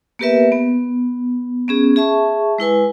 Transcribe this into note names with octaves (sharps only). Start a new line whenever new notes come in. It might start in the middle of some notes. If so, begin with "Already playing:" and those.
A#3 B3 G4 A#4 B4 E5
B3
B3 C#4 G#4
G#4 E5 A5 C#6
G#3 E4 B4 G#5